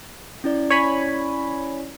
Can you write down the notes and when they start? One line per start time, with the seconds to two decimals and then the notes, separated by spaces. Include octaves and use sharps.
0.44 C#4 E4 D5
0.71 C#5 G#5 B5